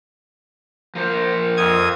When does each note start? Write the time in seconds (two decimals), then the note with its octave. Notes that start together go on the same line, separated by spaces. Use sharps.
0.95 F3 A#4 C5
1.57 F2 D#6 G#6